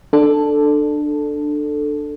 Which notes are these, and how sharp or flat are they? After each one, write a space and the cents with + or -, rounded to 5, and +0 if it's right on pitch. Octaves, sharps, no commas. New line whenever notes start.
D4 +20 A4 +0